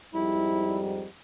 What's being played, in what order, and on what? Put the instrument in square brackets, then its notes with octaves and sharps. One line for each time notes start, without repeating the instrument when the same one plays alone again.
[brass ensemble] F2 G#2 G3 [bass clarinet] E4